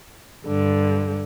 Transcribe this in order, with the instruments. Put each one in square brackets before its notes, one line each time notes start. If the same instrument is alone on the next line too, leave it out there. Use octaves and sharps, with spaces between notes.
[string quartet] G2 D3